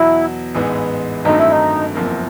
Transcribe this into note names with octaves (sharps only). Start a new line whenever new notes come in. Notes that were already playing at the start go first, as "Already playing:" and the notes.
Already playing: E2 B2 F#3 E4
A1 G#2 E3 G#3 B3
G2 D#3 F#3 A3 C4 D#4
E4
D#4
F#1 E2 C3 F3 A#3